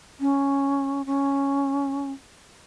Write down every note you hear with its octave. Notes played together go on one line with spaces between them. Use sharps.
C#4
C#4